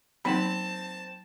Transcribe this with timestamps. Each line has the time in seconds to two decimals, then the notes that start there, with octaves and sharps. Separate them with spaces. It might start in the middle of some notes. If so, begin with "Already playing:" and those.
0.25 F#3 A#3 C4 D#4 A5 B5